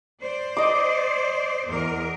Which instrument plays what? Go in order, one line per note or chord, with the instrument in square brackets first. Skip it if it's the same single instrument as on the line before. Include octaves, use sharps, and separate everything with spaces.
[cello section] C5 D5
[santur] D#5 D6
[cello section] E2 A#4